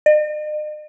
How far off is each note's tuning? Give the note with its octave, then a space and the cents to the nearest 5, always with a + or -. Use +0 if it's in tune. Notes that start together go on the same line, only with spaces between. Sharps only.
D#5 -45